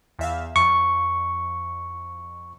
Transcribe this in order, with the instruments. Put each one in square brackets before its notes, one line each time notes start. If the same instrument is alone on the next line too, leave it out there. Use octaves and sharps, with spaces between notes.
[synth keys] E2 E5 F5
[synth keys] F2 [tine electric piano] C#6